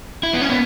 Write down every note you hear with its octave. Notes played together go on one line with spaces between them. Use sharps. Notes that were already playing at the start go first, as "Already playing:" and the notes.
E4
B3
C#4
B3